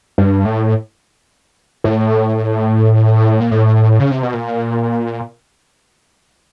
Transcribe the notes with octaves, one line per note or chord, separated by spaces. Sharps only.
G2
A2
A2
A#2
A2
C#3
C3
B2
A#2